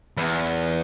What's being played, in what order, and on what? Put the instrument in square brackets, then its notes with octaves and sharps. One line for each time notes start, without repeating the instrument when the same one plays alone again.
[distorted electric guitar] E2